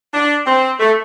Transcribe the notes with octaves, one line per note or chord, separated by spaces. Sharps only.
D4
C4
A3